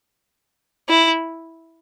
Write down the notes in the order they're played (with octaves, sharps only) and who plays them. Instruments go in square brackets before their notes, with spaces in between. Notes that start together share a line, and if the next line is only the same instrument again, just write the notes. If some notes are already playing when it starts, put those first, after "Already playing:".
[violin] E4